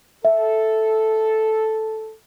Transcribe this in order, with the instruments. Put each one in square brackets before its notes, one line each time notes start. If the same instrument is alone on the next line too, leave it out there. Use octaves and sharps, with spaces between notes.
[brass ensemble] A4 [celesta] E5